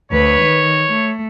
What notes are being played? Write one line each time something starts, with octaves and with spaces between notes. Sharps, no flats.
D2 B4 C#5
D#3
A3